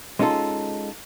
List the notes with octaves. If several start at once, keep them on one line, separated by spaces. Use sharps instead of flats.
G#3 C#4 D#4 F4 A4